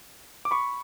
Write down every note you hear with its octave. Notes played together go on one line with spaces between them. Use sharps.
D6
B5 C#6